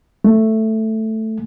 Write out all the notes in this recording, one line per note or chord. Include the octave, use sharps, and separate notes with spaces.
A3